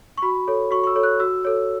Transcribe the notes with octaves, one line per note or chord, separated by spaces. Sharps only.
C#6
F#4 B5
A4 C#5
F#4 C#6
C#6
E6
A4 C#5
F#6
F#4 E6
A4 C#5